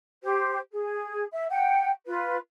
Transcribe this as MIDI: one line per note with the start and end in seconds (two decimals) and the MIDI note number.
0.23 0.57 67
0.23 0.57 72
0.71 1.24 68
1.31 1.45 76
1.49 1.89 78
1.49 1.89 79
2.06 2.37 65
2.06 2.37 71